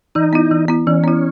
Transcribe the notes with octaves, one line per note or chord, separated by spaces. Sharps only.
E3 D#4
B3 E4
E3
B3 E4
E3 C#4
B3 E4